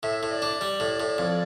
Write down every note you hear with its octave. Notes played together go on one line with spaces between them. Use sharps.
A2 E5
A2
D5
D4
G3 D5
A2
A2
F2